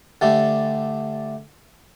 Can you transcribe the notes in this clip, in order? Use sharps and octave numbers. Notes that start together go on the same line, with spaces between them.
D3 G3 A3